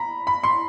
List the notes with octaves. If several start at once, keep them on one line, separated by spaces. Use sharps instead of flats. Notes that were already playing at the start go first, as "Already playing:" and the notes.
Already playing: A#5 B5
B5
C6